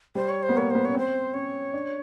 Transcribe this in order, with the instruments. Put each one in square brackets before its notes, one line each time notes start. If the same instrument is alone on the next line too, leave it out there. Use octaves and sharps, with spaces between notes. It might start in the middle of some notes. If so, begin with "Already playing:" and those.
[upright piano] G3 [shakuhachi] C5
[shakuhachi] C#5
C5
[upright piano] B3
[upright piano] A#3 [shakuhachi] C#5
[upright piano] B3 [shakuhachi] C5
[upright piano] C#4 [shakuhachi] C#5
[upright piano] C4 [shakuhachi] C5
[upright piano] C#4 [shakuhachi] C#5
[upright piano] D4